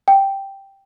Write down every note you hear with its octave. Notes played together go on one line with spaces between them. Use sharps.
G5